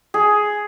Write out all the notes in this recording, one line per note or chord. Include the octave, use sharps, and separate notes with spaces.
G#4